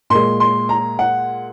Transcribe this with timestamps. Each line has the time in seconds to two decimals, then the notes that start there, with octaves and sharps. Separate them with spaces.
0.10 A#2 G#3 C6
0.40 C6
0.69 A#5
0.99 F#5